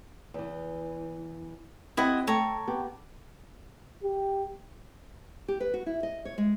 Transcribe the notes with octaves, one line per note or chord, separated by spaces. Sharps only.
E2 E3
C4 E4 G4 D#5 F#5
A3 A4 C#5 G5 A#5
B3 G4
G4
G4
B4
F#4
E4
D#5
C#5
G#3